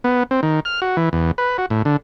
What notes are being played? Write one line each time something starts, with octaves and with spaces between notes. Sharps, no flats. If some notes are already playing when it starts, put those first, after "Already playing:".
B3
C4
D#3
F6
F#4
E3
E2
B4
F#4
A2
D3